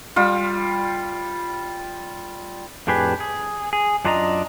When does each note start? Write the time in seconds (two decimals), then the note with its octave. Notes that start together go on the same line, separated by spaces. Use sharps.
0.16 G3 F4
2.87 F2 A2 D4 G4 G#4 B4
3.20 G#4
3.73 G#4
4.05 F#2 D4 F4 D5 D#5 A#5